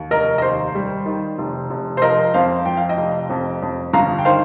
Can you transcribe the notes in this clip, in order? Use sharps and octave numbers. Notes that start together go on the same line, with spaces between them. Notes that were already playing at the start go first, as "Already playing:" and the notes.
Already playing: D#2
F1 A#4 D#5
D#5
D#2 C5
G3
D#3
F1
F1
C5
F3 A#4 D#5
F2 C5 F5
F3 G5
F5
D#5 G5
F1
F2
F2
G1 F5 A#5
G5
D#3 C5 F5